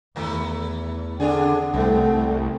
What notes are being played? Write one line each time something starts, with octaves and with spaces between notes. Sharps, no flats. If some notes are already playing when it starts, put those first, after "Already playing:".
E2 D#3 A3 E4
D3 C4 D4 G#4 F#5
C2 G#2 A3 C4